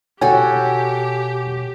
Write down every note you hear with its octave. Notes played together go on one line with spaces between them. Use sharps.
B2 F#4 G4 A4 C#5 G5 G#5